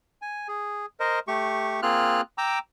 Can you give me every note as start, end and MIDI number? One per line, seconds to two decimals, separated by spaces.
0.22 0.48 80
0.48 0.86 68
1.00 1.19 70
1.00 1.19 72
1.00 1.19 75
1.28 1.81 57
1.28 1.81 67
1.28 1.81 85
1.82 2.21 58
1.82 2.21 60
1.82 2.21 65
1.82 2.21 68
1.82 2.21 89
1.82 2.21 90
2.38 2.59 79
2.38 2.59 82
2.38 2.59 86
2.38 2.59 88